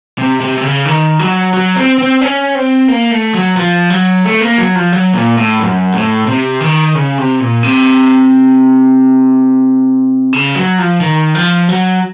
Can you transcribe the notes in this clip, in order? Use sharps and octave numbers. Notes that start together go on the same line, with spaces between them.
C3
C3
C3
C#3
D#3
F#3
F#3
C4
C4
C#4
C4
A#3
A3
F#3
F3
F#3
A3
A#3
F#3
F3
F#3
A#2
A2
F#2
A2
C3
D#3
C#3
C3
A#2
C3
C#3
F#3
F3
D#3
F3
F#3